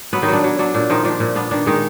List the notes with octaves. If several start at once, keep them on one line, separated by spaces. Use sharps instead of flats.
F#3 B3 B4
D#3 D#4
F#3 D4
F#3
F#3 D4
A#2 D4
D#3 F3 D#4
F3 D4
A#2
B3 D4
D#3 D4
D#3 G#3 D#4